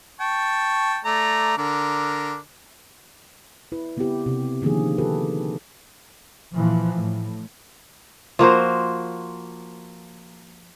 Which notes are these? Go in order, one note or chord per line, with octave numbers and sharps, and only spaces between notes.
G5 A5 C#6
A3 D5 A#5
D3 D4 A#4
E4 B4
C#3 B3 C4 E4 G4
C3
D3 D#3 F3 A#3 G#4
F4 G4 A4 B4
A#2 E3 F3
A2
F3 A#3 F#4 C5